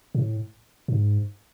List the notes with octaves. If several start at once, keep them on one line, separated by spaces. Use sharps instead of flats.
A2
G#2